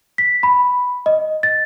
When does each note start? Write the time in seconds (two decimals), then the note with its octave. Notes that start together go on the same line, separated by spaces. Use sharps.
0.18 B6
0.43 B5
1.06 D#5
1.43 A6